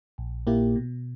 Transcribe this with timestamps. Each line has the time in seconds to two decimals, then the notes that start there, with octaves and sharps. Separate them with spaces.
0.18 A#1
0.47 A#2 A#3 E4 G4
0.76 B2